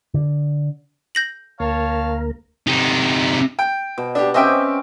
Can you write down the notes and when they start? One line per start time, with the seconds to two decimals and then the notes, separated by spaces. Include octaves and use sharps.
0.14 D3
1.15 G6 A#6 F#7
1.60 D2 A#3 A#4 C#5 F5 A5
2.67 C3 D#4
3.59 G5
3.98 B2
4.15 D4 G4
4.34 C4 C#4 G4 D#5 E5 G5